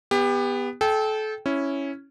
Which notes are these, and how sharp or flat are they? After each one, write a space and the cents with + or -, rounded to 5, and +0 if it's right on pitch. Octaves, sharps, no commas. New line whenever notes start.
B3 +0 G4 +30
A4 -30 G5 -5
C#4 +0 E4 +0